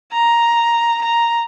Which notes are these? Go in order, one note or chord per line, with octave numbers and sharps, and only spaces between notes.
A#5
A#5